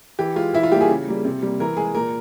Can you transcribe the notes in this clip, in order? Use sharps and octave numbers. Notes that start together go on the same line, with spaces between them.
E3 G4
G#3 F4
E3 E4
F4
G3 A#3 G4
G#4
C#3
G3 A#3
C3
G3 A#3
E3 A#4
G#3 G#4
A#2 A#4